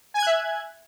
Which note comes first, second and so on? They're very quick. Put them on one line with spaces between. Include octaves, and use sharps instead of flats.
G#5 G#6 F#6 E5